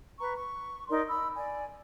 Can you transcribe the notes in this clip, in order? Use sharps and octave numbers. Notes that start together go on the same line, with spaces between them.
B4 A#5 C#6
C#6
D#4 A#4 D5 C6
B5 E6
D5 G#5